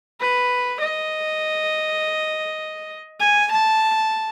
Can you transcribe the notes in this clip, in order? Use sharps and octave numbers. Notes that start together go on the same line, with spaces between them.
B4
D#5
G#5
A5